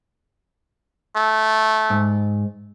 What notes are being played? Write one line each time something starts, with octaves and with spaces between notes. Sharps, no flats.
A3
G#2